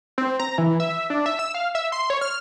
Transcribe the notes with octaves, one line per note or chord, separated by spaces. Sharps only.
C4
A#5
E3
E5
D4
E5
E6
F5
E5
C6
C#5
F6